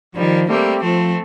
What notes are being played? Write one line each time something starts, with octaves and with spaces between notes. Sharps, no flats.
D#3 F3 G3
G3 A3 A#3 C4 G4
F3 A3 C4